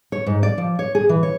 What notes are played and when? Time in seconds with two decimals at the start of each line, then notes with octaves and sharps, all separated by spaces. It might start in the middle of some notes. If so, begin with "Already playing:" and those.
0.12 C#5
0.26 G#2
0.43 D5
0.58 F3
0.79 C#5
0.95 G#4
1.09 E3
1.23 C#5